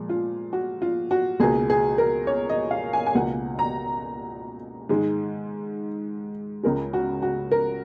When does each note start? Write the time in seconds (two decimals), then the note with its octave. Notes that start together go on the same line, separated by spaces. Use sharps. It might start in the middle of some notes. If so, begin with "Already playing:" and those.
Already playing: A#2 F3 G#3
0.09 F4
0.53 F#4
0.82 F4
1.11 F#4
1.40 C#2 B2 A#3 G#4
1.70 G#4
1.98 A#4
2.27 C#5
2.49 D#5
2.71 F5
2.93 G#5
3.06 G#5
3.15 C#2 B2 A#3 F#5
3.59 A#5
4.89 G#2 D#3 G#3
6.63 C#2 C#3 G#3 A#4
6.93 F#4
7.22 F#4
7.52 A#4